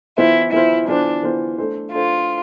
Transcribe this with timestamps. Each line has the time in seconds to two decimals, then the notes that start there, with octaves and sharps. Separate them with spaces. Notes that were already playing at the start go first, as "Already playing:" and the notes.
0.17 E3 B3 E4 F4 C5
0.52 E3 B3 E4 F4 C5
0.88 E3 B3 D4 F4 C5
1.23 E3 B3 F4 C5
1.58 A3 D4 A4 C5
1.93 A3 D4 F4 A4 C5